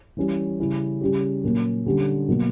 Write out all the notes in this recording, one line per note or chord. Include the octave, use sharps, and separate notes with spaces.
E3 G3 C#4
C#3 G3 C#4 E4
C#3 G3 C#4 G4
A#2 F#3 A#3 C#4
D3 G3 C#4 G4
B2 F#3 A#3